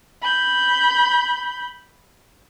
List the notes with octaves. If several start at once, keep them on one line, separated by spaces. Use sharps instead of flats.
B5 G6